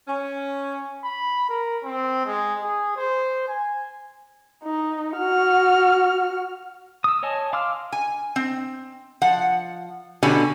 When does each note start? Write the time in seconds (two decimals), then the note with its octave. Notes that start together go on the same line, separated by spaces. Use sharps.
0.08 C#4
1.04 B5
1.49 A#4
1.84 C4
2.26 G#3
2.62 G#4
2.97 C5
3.48 G#5
4.64 D#4
5.17 F#4 F6
7.04 D#6 E6
7.23 C#5 D#5 G#5 A5
7.53 F5 C6 D6 E6 F6
7.92 G#5
8.36 C4
9.22 F3 F#5
10.23 B2 D3 C#4 G4 G#5